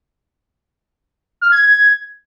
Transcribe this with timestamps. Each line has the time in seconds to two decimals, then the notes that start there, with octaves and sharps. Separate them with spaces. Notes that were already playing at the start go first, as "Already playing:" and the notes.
1.41 F6
1.52 G#6
1.62 G#6